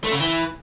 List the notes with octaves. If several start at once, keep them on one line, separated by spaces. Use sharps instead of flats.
A3
C#3
E3